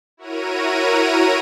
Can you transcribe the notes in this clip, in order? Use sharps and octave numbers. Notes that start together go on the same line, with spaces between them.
E4 F#4 A#4 C#5 A#5 D#7